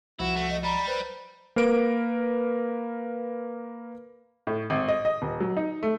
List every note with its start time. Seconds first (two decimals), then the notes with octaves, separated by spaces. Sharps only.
0.20 C2 F3 E4 F#4
0.36 A3
0.50 D#5
0.64 G3 A#5 B5
0.88 B4 C5
1.56 A#3 A#4 B4 D7
4.47 A2
4.70 G#1
4.88 D#5
5.05 D#5
5.22 D#1
5.40 F#3
5.57 D#4
5.83 A3